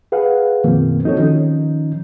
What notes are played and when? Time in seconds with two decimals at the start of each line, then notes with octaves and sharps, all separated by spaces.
0.12 G#4 B4 F5 F#5
0.64 F#2 B2 D#3 F3 A#3 C4
1.04 C4 D#4 F#4 A4 C#5
1.18 D#3 F3 C#4 D#4